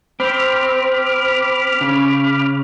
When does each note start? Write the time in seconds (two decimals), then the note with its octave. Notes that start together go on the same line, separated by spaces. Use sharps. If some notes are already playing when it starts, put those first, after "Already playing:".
0.20 C4 B5 D6 F6
1.81 C#3